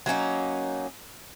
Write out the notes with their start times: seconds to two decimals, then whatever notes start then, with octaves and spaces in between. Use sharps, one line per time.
0.06 F#3 A#3 C#4 D#4